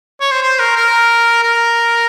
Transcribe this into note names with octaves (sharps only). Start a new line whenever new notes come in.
C#5
C5
C5
A#4
A#4
A#4